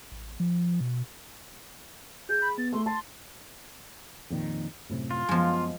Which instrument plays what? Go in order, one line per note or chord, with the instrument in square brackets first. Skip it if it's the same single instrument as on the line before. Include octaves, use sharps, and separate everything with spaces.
[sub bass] A1
F3
B2
[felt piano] G#4 [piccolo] G6
[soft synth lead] B5
[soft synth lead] B3 [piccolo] A6
[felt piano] A3 [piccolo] C6
[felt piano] A5 [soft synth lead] C6 [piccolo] A6
[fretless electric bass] F2 A#2 D#3
F#2 A2 C3
[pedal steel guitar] F4
[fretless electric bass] F#2 B3 [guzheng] F3 G#3